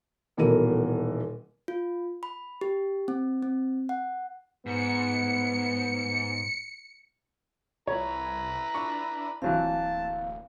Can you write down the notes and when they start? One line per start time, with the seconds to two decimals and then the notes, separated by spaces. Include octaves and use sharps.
0.37 D#1 B2 E3 A4 A#4 D#7
1.68 F4
2.23 B5
2.61 G4
3.08 C4
3.43 C4
3.89 F#5
4.66 G#2 B3 C#7
7.87 C2 E4 B4 C#5 A#5
8.74 D4 C#6
9.42 D1 E3 F#3 A#3 C4 F5 A5